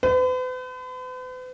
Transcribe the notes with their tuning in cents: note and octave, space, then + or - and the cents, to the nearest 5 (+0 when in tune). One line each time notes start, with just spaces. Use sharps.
B4 +45